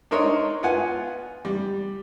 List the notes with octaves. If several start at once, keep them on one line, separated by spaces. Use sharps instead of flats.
D4 D#4 A#4 C5 C#5
B3 F4 F#5 G#5
G3